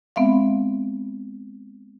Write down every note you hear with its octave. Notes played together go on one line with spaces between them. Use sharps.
G#3 B3 C4 E5 F5